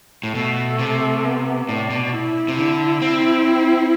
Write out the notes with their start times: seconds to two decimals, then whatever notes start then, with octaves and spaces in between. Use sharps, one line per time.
0.23 A2
0.34 B2 A3
0.79 C3
1.24 B3
1.68 A2 D4
1.90 B2
2.13 E4
2.48 C3
2.57 D3 E4
3.02 C4